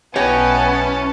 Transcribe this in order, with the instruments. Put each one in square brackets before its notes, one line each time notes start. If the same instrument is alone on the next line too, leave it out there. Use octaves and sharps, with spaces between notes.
[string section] B1 E4 A5 [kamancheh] B3 [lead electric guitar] C#4 [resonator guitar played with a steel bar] G4 C#5 D#5